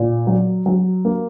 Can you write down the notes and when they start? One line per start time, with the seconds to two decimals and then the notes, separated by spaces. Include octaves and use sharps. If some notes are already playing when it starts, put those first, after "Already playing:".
Already playing: A#2
0.27 F#3
0.66 F#3
1.05 A#3